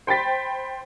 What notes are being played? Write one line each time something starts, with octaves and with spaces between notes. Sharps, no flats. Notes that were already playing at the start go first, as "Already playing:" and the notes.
C5 G5 B5 A6 B6